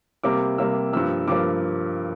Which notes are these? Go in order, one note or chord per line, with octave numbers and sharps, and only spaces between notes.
C3 G3 A#3 D6
C3 G3 A#3 E6
G2 F3 A#3 E6
G2 F3 A#3 D6